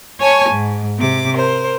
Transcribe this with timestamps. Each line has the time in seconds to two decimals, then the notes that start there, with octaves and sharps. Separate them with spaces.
0.20 C#5 G#5 A5 C#6
0.50 G#2
0.98 C3 D6
1.33 A#4 C5